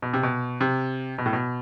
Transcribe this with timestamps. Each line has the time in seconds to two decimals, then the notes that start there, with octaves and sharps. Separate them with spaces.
0.02 B2
0.13 C3
0.23 B2
0.61 C3
1.18 B2
1.26 A2
1.33 B2